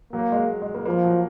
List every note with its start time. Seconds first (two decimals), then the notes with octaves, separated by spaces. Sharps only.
0.13 F#3 A#3
0.32 G#3
0.62 G#3
0.75 A#3
0.86 F3 A#3
1.04 F#3